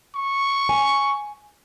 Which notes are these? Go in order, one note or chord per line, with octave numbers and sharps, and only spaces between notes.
C#6
G#5